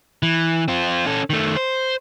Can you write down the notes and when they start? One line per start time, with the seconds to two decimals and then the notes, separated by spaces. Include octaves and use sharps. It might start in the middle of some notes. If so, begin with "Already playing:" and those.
0.23 E3
0.68 C4 F4
1.06 C#4 A4
1.30 D#3 A3
1.56 C5